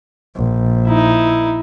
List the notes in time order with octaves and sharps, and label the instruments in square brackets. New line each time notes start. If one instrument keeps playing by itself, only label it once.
[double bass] A#1
[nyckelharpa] D#4 E4